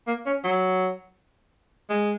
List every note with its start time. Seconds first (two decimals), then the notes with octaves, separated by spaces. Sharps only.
0.07 A#3
0.26 C#4
0.44 F#3
1.89 G#3